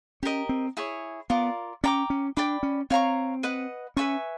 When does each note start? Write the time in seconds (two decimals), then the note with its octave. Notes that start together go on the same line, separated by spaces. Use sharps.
0.23 C#4 G4 A#4 D#5
0.49 C4
0.77 E4 G#4 C#5
1.30 B3 F4 A#4 D5
1.84 C#4 D5 G5 A#5 D6
2.10 C#4
2.37 D4 D5 G5 B5 D6
2.63 C#4
2.90 C4 C#5 F5 A#5 C#6
3.43 B4 D#5 F#5
3.97 C#4 B4 E5 G#5 C#6